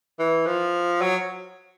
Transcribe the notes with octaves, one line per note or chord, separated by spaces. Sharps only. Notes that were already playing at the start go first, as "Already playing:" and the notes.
E3
F3
F#3